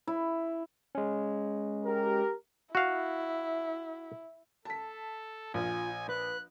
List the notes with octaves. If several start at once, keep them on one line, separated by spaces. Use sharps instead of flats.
E4
G#3 C#4
G4 A#4
E4 F#4 F5
A4 A5 B6
A#1 F4 G#5
B4 F#6